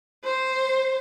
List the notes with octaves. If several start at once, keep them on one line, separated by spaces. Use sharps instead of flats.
C5